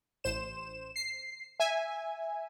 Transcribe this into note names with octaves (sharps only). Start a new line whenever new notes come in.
A1 C5 E7
C7
E5 G#5